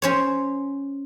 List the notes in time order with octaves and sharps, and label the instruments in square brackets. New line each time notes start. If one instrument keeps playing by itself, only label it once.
[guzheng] C#4 C5 C#5